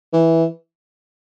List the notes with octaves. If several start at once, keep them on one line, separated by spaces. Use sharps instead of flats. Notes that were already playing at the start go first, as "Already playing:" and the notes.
E3